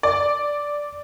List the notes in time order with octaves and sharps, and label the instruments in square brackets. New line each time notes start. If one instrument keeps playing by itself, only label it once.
[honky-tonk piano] D5